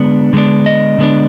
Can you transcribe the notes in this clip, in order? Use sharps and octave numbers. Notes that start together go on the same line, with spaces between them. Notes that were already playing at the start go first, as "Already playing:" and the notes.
Already playing: D3 G#3 B3 D4
D3 G#3 B3 D4
D#5
D3 G#3 B3 D4